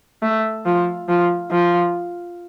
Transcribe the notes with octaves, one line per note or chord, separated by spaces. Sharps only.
A3
F3
F3
F3